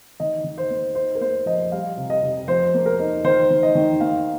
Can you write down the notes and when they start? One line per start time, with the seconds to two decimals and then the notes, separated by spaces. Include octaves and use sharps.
0.20 D#3 D#5
0.44 D#3
0.58 C5
0.70 A#3
0.95 D#4 C5
1.15 A#4
1.21 A#3 C5
1.46 F3 D#5
1.72 G3 F5
1.97 C3
2.10 D#5
2.22 C3
2.48 F3 C5
2.74 A#3
2.86 A#4
2.99 D#4
3.24 D#3 C5
3.50 D#3
3.63 D#5
3.75 D#3
4.00 A#3 F5